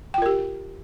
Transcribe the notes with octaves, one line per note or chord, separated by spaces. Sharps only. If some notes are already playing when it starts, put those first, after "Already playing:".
F4 G4 A#4 G5